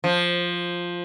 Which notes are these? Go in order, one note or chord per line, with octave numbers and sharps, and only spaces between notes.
F3